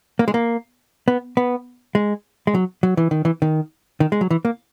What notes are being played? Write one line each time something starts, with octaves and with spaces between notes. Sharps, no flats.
A#3
G#3
A#3
B3
B3
G#3
G#3
F#3
F#3
E3
D#3
E3
D#3
D#3
G#3
F#3
E3
A#3